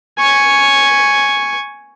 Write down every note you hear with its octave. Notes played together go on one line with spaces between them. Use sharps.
G#5 C#6